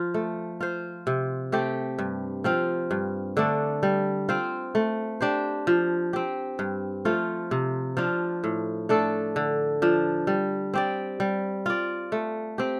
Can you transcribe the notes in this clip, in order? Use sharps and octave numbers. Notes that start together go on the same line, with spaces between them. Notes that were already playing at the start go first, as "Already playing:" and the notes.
Already playing: F3 F4
A3
F4 C5
C3
A3 C4 G4
G2
F3 C4 F4
G2
D3 A3 D4
G3
C4 F4 C5
A3
D4 G4 C5
F3
C4 G4
G2
F3 A3 F4
C3
F3 D4 F4
A2
A3 D4 A4
D3
F3 D4
G3
C4 G4 D5
G3
F4 D5
A3
C4 G4